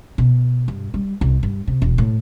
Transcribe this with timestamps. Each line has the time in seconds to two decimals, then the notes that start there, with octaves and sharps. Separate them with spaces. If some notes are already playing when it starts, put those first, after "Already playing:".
0.18 B2
0.68 G2
0.94 G3
1.21 C2
1.43 G2
1.68 C3
1.82 E1
1.98 A2